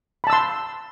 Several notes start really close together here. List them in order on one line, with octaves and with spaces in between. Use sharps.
B5 A5 E6 C6